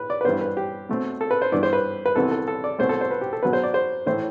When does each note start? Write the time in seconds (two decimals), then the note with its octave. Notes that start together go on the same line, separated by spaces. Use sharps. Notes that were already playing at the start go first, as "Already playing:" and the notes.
Already playing: A2 B4
0.10 D5
0.21 B4
0.25 G2 E3 G3 B3 C5
0.41 B4
0.57 G4
0.89 B2 A3 C4
1.21 A4
1.31 B4
1.42 C5
1.52 G2 E3 B3 D5
1.63 C5
1.73 B4
2.06 B4
2.16 C2 C3 E3 B3 A4
2.31 A4
2.48 A4
2.64 D5
2.79 C2 B2 A3 C4 C5
2.89 A4
3.01 C5
3.11 B4
3.21 G4
3.33 A4
3.43 B2 F#3 B3 B4
3.53 C5
3.63 D5
3.74 C5
4.06 A2 E3 A3 C5